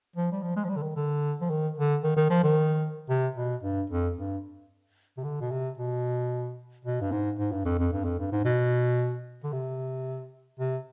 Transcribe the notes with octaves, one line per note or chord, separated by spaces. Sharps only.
F3
G3
F3
G#3
F3
G3
D3
D#3
D3
F3
D#3
D3
D#3
D#3
F3
D#3
C3
B2
G2
F2
G2
C3
D3
B2
C3
B2
B2
G2
G#2
G#2
G2
F2
F2
G2
F2
G2
G#2
B2
D3
C3
C3